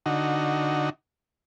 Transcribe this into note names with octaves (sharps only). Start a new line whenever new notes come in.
D3 D#4 F#4